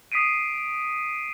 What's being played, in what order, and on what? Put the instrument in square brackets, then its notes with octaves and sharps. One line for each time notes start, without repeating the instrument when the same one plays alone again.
[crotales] D#6 B6 C7 D7 D#7